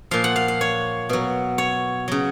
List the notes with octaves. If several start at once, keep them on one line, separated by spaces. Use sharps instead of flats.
A#2 F3 F5
F#5
F5
F5
C#5
B2 F#3
C#5
C#3 F#3